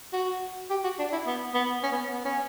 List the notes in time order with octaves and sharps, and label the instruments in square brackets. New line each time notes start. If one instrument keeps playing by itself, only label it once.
[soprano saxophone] F#4
G4
F#4
D4
E4
B3
B3
C#4
B3
B3
C#4